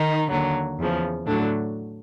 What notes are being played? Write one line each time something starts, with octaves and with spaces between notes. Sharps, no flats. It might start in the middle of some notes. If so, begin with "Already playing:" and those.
Already playing: D#3 D#4
D#2 D3 F#3
E2 C#3 F3
A2 D3 F#3 D4